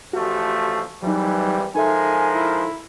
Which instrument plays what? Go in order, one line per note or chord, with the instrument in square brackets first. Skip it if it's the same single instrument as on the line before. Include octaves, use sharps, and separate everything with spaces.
[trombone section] A1 F3 A3 [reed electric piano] F#4 G4
[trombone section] G#1 E3 [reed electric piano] F#3 D#4 [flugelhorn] G3
[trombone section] F3 G#3 A#4 [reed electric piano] D#4 A4 E5 [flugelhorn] G#5
[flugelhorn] E4